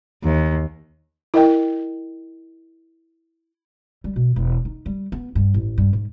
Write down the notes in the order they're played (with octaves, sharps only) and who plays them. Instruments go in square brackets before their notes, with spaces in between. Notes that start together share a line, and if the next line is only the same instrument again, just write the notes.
[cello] D#2
[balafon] E4 A#4 D#5 G5
[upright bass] G3
B2
E1
D#4
G3
B3
G2
A1
G2
G#2